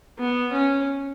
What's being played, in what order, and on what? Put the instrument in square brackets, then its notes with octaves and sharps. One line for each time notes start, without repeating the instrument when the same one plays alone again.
[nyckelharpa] B3
C#4